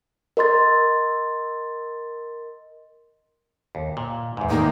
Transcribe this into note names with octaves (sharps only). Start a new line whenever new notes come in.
A#4 D#5 C6 A6
D#2
A#2
E2 G#2
D#3 A#3 D#4 G4